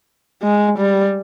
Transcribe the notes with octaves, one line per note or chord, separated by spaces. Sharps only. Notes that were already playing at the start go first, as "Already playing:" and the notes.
G#3
G3